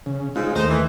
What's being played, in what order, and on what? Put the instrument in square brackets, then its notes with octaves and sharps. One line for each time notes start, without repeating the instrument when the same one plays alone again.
[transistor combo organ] C#3
[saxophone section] G#2 C#3 [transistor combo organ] G#3 D#4 F4
[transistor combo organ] D#2 A3 [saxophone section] D#4 C5
[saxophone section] E3